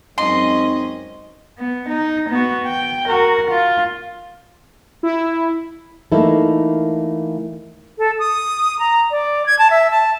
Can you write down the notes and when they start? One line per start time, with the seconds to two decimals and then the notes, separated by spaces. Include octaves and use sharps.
0.18 F#2 G#3 C4 C#4 D#4 D#5 C6
1.58 B3
1.89 D#4
2.29 B3 F#4
2.67 G5
3.09 F#4 A#4
3.50 F4
5.03 E4
6.12 E3 A3 A#3 D#4 E4 A4
7.98 A4
8.19 D#6
8.79 A#5
9.11 D5
9.46 G#6
9.59 A5
9.70 E5
9.91 A5